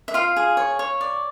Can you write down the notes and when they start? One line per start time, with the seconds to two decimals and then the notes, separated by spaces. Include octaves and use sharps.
0.08 E5
0.14 F4 F5
0.37 G#4
0.57 C#5
0.79 C#5
1.01 D5